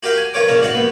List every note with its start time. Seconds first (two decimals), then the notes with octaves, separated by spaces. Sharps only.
0.03 F#4 G4 A#4 F5 G5
0.17 G#5
0.34 G2 F4 A#4 C#5 D6
0.48 A#2 C#3 C#4
0.61 G#2 F#4 F5 F#5
0.74 D#2 B3